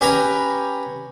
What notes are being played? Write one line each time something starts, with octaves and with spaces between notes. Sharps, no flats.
C#4 G4 B4 G#5 A#5